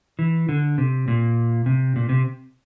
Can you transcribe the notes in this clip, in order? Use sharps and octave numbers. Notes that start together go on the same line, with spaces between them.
E3
D3
C3
A#2
C3
A#2
C3